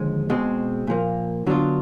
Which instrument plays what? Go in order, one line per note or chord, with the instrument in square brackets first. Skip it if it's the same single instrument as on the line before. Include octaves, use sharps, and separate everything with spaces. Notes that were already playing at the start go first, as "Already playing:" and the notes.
Already playing: [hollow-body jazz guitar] D#2 D3 F3 G#3
B2 G#3 C4
A#2 F3 A#3
D3 F#3 B3 D4 F4